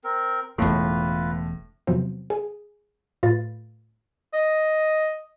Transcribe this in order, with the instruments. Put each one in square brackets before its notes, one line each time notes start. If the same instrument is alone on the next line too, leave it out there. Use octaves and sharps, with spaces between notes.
[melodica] C4 A#4
[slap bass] E1 C#3 [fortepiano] A2 [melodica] F4 B4
[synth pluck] E2 C3 F3 F#3 B3 C4
G#4
A2 A3 F4 B4 A6
[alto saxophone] D#5